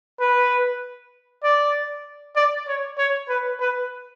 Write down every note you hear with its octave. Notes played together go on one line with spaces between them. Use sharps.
B4
D5
D5
C#5
C#5
B4
B4